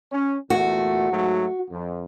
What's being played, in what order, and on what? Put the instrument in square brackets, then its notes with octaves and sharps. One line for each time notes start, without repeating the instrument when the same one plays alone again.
[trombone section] C#4
[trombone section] E2 A#2 A3 [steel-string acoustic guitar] F#4
[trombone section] G#2 F#3 A3
F2